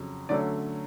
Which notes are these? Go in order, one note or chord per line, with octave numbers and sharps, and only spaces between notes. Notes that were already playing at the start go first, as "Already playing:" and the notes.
Already playing: F2 C#3 F#3
D3 F#3 A3 C#4 D5